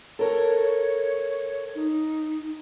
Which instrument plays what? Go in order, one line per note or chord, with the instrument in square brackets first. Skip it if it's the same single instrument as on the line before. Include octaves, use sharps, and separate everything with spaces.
[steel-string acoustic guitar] A4 A#4 [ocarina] C#5
[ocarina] D#4